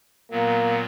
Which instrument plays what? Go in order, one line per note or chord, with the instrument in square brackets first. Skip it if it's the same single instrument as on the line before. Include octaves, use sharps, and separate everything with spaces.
[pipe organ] A#2 F#3 B3 [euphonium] A#3